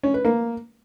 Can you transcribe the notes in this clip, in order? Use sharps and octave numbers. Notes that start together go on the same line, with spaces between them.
C#4
B4
A#3